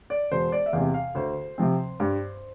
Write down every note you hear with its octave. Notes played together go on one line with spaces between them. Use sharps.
D5
E1 C5
D5
E5
E2 C3 F5
F5
D2 C5
C3 F3 C4
G2